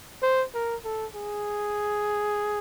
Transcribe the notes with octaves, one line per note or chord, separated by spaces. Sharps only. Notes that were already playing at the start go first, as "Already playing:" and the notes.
C5
A#4
A4
G#4